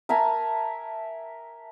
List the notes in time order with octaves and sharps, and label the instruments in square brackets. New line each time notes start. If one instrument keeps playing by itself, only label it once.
[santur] A#4 E5 G#5 A5